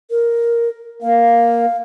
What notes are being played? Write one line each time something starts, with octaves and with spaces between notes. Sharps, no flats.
A#4
A#3 F5